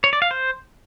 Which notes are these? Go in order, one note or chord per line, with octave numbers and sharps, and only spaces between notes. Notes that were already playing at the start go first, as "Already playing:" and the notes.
C#5
D5
F5
C5